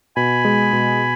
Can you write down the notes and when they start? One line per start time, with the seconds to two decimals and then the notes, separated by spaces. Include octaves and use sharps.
0.16 B2 G#5 B5
0.45 G#3
0.73 B2